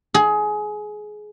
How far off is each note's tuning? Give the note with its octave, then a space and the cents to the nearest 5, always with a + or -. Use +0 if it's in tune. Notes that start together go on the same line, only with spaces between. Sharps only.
G#4 +20